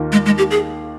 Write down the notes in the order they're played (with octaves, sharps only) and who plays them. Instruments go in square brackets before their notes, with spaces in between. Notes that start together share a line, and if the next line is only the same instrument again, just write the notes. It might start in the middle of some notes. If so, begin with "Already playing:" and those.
Already playing: [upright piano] D#2 D#3 A#3 F4
[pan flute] G#3
G#3
G4
G#4